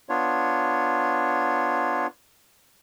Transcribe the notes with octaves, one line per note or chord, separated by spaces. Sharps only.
B3 D4 F4 C#5